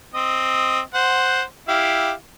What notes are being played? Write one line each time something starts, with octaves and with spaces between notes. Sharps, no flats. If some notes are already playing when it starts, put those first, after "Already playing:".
C4 D#5
C5 F#5
E4 G4 F5